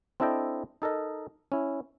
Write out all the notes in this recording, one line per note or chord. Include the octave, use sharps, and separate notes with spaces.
C4 D4 E4 A4 D#5 G5
D#4 A4 A#4 D#5
C#4 E4